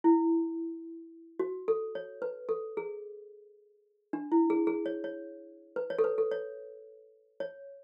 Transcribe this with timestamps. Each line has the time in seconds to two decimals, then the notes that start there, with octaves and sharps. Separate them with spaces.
0.04 E4
1.39 F#4
1.68 A4
1.95 C#5
2.22 B4
2.49 A4
2.77 G#4
4.13 D4
4.32 E4
4.50 G#4
4.67 G#4
4.86 C#5
5.04 C#5
5.76 B4
5.90 C#5
5.98 A4
6.04 B4
6.18 A4
6.32 C#5
7.40 C#5